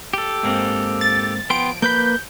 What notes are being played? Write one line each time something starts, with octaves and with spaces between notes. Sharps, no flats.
G4 A4
G#2 A#3 C4
A6
F3 B3 G5 C6 D7
A#3 B4 B5 G6